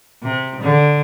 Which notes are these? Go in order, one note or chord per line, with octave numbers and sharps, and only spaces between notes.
C3
D3